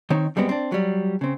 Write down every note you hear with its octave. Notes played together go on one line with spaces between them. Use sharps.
D#3 C4 D#4 C5 C#5
F#2 G3 G#3 B3 C4
C4 D4
F#3 G3
C#3 C4